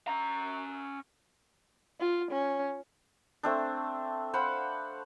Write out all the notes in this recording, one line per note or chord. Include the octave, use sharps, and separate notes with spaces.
C#4 A#5
F4
C#4
A3 C4 D4
C5 F5 F#5 B5